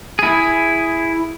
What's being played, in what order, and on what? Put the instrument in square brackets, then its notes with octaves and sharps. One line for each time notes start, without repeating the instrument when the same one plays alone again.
[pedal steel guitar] E4 G#4